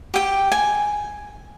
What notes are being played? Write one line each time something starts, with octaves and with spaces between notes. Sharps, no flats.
G4 G5
G#5